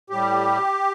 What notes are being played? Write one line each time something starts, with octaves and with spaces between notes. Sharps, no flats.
A2 G3 G4